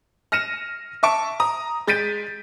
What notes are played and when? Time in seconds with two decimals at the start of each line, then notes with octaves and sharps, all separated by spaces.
0.32 F6 A#6 C#7 D#7 E7
1.03 E5 A5 C#6 D7
1.40 A#5 D#6
1.87 G#3 G6 A6 B6 D7 D#7